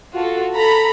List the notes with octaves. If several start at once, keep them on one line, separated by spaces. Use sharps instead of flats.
F4 F#4 A4
A4 A#5 B5